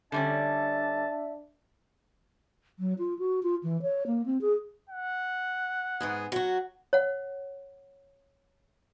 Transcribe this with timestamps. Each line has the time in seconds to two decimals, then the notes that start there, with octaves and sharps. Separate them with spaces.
0.12 D3 G3 C#4 D4 E5 A5
2.79 F#3
2.99 F4
3.19 F#4
3.43 F4
3.63 E3
3.82 C#5
4.07 A#3
4.26 C4
4.41 G#4
4.90 F#5
6.00 G#2 B3 G#4
6.32 F#3 F#4
6.93 C#5 F#5